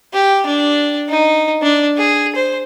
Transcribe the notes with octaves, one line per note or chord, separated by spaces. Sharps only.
G4
D4
D#4
D4
G#4
C5